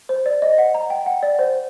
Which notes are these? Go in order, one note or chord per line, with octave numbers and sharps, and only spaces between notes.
C5
D5
D#5
F#5
A#5
G5
F#5
D5
C5